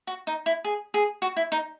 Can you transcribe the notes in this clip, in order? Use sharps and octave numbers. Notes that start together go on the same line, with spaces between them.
F#4
D#4
E4
G#4
G#4
F#4
E4
D#4